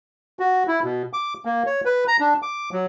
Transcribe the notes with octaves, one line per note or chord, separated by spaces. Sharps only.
F#4
E4
B2
D6
A#3
C#5
B4
A#5
D4
D6
F#3